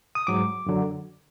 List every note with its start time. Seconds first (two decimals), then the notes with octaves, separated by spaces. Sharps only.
0.15 D#6
0.27 G#2 F#3 D6
0.66 F#2 D3 F#3